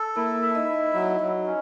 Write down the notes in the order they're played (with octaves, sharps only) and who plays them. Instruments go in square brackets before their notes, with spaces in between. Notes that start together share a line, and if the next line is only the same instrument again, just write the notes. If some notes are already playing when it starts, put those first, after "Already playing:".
Already playing: [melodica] A4
[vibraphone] A#3 A#4 [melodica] E4
[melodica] E5
[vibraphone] D#4 D#5
[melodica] E4
F#3
F#3
C#4